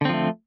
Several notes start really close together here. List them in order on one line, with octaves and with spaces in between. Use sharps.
D3 C4 F3 A3